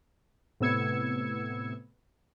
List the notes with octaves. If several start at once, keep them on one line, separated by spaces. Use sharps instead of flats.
A2 C3 B3 E6 G#6 C#7